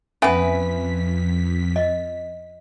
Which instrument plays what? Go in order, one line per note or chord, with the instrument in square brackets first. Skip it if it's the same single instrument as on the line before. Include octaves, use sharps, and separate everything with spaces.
[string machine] F2 B6 [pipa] B3 B4 [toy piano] C#4 E5 G#5
[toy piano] D#5